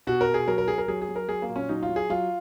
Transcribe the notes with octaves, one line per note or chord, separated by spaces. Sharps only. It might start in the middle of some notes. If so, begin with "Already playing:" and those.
B2 F#4
A#4
B2
G#4
F#3 A#4
A#4
F#3 G#4
A#4
F#3 G#4
G#4
F#3
A#4
F#3 G#4
A#3
A#2
C#4
F#3 D#4
F4
F#3
G#4
F#3 F4